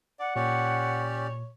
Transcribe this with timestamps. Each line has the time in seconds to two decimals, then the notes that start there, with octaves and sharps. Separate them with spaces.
0.20 D5 F#5
0.36 A#2 C#4 G4 C#5 D5